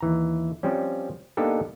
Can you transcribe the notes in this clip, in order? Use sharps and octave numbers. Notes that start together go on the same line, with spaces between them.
D#2 E3 A#5
F3 G3 C4 C#4
A#3 B3 D4 D#4 G4 A4